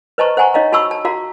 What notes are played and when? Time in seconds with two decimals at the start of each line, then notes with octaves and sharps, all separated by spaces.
0.18 B4 C5 D#5 A5 A#5 C#6
0.37 C5 F#5 G#5 A#5 C#6
0.54 D#4 C#5 D#5 F5 A#5
0.72 F#4 A5 B5 C#6 E6
0.91 A5
1.05 F#4 F5 A#5